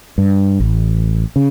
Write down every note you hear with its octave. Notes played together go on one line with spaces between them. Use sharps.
G2
A1
C#3